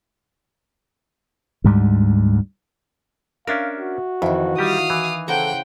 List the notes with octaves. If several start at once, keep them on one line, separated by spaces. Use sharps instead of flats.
D2 G#2 G3
C#4 D4 A#4 E5 F5
F#4
F2 D#3 E3
G3 G4 F5 D#6
E3
C#3 A4 C5 F#5 G5 A#5